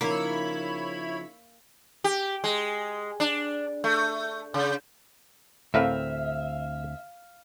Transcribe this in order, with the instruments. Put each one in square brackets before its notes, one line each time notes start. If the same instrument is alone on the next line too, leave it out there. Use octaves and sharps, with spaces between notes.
[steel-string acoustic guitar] C#3 F3 D#4 [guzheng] A#3 [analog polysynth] E4 C#5 B5
[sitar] G4
G#3
D4
A3
C#3
[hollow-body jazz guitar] D2 C4 [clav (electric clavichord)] A2 A#4 B4 [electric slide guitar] E5 [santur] F5